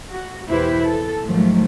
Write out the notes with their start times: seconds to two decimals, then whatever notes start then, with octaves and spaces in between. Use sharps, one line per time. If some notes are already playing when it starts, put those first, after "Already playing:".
0.11 F#4
0.48 E2 B2 E4 G4 B4 C5
0.84 A4
1.24 G#2 D#3 F3 F#3 A3